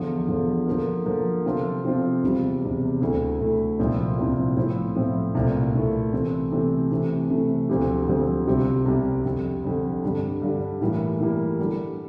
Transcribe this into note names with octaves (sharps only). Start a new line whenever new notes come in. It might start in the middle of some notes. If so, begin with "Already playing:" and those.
Already playing: E2 D3 F3
E2 D3 F3
D3 F3 A#3
D3 F3 A#3
C3 F3 C4 F4 A4
C3 F3 C4 F4 A4
E2 C3 G3
E2 C3 G3
D2 D3 A3 E4
D2 D3 A3 E4
C2 A#2 F3 C4 E4
C2 A#2 F3 C4 E4
A2 F3 C4 E4
A2 F3 C4 E4
C2 A#2 A3 E4
C2 A#2 A3 E4
C3 E3 A3 C4
C3 E3 A3 C4
C3 E3 A3
C3 E3 A3
D2 D3 F3 C4 G4
D2 D3 F3 C4 G4
C2 C3 G3 C4 G4
C2 C3 G3 C4 G4
F2 D3 G3
F2 D3 G3
G2 D3 G3 D4
G2 D3 G3 D4
A2 E3 G3 A#3
A2 E3 G3 A#3
D3 G3 D4